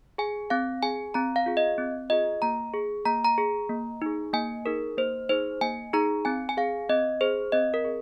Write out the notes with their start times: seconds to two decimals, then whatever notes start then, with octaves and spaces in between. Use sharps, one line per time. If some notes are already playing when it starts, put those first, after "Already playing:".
0.18 G#4 G#5
0.50 C4 F5
0.83 G#4 G#5
1.14 C4 A#5
1.36 F5
1.46 F4 G#4
1.57 D#5
1.78 C4
2.10 F4 G#4 D#5
2.42 A#3 A#5
2.74 G#4
3.06 A#3 A#5
3.24 A#5
3.38 G#4
3.69 A#3
4.02 D#4 G#4
4.33 A#3 G#5
4.65 D#4 G#4 A#4
4.97 A#3 C5
5.29 D#4 G#4 C5
5.61 A#3 G#5
5.93 D#4 G#4 A#5
6.25 C4 G#5
6.49 G#5
6.57 G#4 F5
6.89 C4 D#5
7.21 G#4 C5
7.52 C4 D#5
7.74 A#4
7.85 G#4